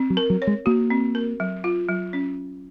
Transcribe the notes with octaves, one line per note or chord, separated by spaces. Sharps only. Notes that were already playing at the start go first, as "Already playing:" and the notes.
Already playing: C4
F#3
A#4
F#3
C#5
G#3
A#3 F#4
C4
A#4
F#3
F4
F#3
C#4